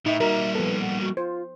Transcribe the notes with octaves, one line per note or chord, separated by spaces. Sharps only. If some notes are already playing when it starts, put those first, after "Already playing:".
A2 D#4 E5
G3 A#3 F#4 A#4
F3 B3 A4 B4
F#5
F#4
F4 C5